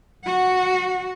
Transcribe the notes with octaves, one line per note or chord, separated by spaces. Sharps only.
F#4 F#5